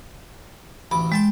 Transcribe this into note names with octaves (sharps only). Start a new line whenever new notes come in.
A1 D2 B5 D6
G#3 G5 A5 C6